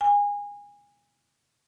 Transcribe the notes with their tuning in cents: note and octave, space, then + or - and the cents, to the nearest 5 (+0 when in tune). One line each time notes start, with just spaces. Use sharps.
G#5 -25